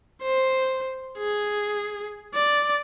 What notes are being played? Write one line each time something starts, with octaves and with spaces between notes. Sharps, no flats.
C5
G#4
D5